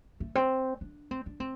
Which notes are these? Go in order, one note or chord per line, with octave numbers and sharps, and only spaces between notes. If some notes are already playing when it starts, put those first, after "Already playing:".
A3
C4
D4
C4
D4
C4